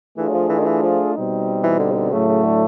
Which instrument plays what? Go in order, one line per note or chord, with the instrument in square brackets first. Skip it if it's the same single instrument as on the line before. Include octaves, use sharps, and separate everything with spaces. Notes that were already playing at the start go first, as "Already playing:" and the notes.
[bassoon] E3 [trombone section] A3 D4 F4 G#4
[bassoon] F#3
F3
E3
D#3
E3
F3
[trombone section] B2 G3 C4 D#4
[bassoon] E3
D3
C#3
D3
[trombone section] A2 F#3 A3 [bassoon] C#3
[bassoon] C#3
D3